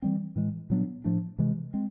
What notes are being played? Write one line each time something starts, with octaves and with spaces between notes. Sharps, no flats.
E3 G3 C4
A2 E3 G#3
A#2 F#3 B3 D4
A2 F3 A3 D4
C3 E3 G#3
G#3 C4